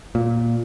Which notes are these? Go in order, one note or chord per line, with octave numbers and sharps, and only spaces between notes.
A#2